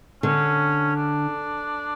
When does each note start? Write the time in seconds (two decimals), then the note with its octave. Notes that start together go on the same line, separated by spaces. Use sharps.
0.23 D3 C#4
0.96 D4